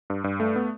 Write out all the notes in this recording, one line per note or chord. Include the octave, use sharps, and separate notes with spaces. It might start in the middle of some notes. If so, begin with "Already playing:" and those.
G2
G2
A3
B3